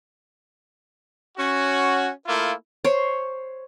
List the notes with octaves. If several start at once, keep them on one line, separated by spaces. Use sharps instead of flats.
C#4 F#4
A3 A#3 E4 F4
C5 C#5